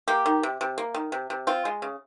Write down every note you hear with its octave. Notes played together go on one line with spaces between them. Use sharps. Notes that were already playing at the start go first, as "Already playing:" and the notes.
A#3 G4
D#3
C3
C3
A#3
D#3
C3
C3
C4 F4
G#3
C#3